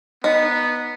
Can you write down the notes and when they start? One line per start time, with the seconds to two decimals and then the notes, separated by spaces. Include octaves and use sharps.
0.24 B3 D#4